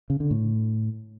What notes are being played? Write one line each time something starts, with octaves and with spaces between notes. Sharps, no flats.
C#3
D3
A2